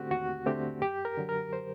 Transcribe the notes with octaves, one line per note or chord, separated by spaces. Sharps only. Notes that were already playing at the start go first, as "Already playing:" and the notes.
Already playing: D3 A3 C4 F#4 G4
D#2 F#4
D3 A3 C4 G4
F#2 G4
A#4
D3 F#3
A#4
C5